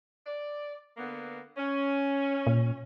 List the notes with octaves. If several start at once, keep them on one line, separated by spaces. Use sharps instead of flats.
D5
D3 A#3 B3
C#4
A#2